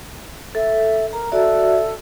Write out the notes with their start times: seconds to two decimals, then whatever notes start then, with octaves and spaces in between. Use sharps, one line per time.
0.55 A4 E5
1.13 A#4 A#5
1.32 F#4 A4 D5 E5